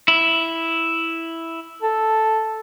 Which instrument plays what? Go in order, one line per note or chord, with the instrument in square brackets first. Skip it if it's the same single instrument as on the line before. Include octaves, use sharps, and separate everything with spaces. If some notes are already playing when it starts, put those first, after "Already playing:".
[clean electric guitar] E4
[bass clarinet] A4